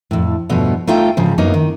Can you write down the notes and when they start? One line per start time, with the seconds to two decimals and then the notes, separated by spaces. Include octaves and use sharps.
0.11 F2 A2
0.49 E2 G2 B2 F3 A3 B3
0.87 A3 D#4 F4 A4 G5
1.17 G#2 C#3 F3
1.38 F#2 F#3 A#3 B3 D#4
1.54 D#3